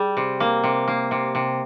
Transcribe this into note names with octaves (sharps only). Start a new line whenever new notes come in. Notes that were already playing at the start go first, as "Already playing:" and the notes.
Already playing: G3 G#4
C3
A#3
C3
A#3
C3
C3